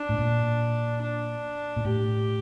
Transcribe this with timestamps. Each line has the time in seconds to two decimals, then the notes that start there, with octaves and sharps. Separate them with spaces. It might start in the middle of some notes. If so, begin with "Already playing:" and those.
Already playing: D4
0.09 A2
0.19 A#2
1.02 D4
1.76 A#2
1.85 A2 G4